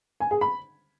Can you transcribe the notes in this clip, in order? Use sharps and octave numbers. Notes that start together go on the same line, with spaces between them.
G#5
G#4
B5